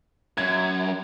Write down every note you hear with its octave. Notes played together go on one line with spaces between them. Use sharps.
F#2 G#6